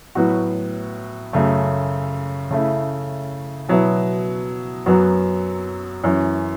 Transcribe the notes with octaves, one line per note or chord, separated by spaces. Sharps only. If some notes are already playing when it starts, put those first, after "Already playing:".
A2 F#3 B3 F#4
F#2 C#3 A3
C#3 A3 E4
B2 F#3 B3 E4
F#2 F#3 B3 F#4
F#2 E3 C#4